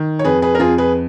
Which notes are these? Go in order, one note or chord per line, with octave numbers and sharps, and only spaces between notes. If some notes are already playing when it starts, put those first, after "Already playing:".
Already playing: D#3
C#5
F2 G#4 B4
G#4 B4
A#4
F2 F4 G#4
G#4 B4